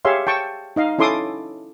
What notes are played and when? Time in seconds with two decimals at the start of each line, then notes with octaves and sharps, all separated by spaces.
0.05 G4 G#4 C#5 E5 F5 C6
0.27 G5 A5 C#6
0.76 D#4 D#5 F5
0.98 C#4 E4 A4 C6 D6 D#6